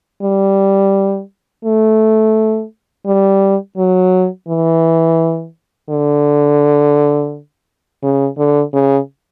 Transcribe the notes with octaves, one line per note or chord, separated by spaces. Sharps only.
G3
A3
G3
F#3
E3
D3
C#3
D3
C#3